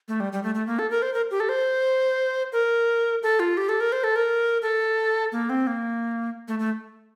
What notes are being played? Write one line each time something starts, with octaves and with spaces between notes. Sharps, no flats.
A3
G3
G3
A3
A3
A#3
A4
A#4
C5
A#4
G4
A4
C5
A#4
A4
F4
G4
A4
A#4
C5
A4
A#4
A4
A#3
C4
A#3
A3
A3